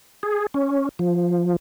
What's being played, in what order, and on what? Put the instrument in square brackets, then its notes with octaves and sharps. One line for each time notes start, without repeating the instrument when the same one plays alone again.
[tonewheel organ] G#4
C#4
F3